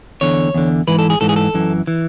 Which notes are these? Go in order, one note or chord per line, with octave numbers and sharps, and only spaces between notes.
E2 D3 C#5
E2 D3
G#2 E3 B4
A4
G#4
G#2 E3 A4
G#4
A4
F#2 E3
E3